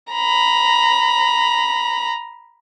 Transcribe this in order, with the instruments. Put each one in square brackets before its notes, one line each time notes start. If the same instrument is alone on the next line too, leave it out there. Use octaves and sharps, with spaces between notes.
[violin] A#5 B5